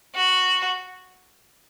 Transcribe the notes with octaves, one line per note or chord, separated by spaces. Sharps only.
F#4